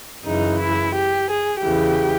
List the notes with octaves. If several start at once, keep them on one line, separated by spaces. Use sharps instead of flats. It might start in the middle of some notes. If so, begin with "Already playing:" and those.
F#2 C#3 E3 D#4
E4
G4
G#4
E2 C#3 E3 G4